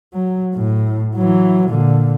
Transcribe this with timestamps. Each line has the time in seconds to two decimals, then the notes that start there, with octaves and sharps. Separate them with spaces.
0.14 F#3
0.55 A2
1.15 E3 F#3
1.68 A#2 D3